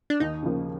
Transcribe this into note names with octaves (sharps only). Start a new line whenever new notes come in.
D4
D#2 D#4
C#3 F3 A#3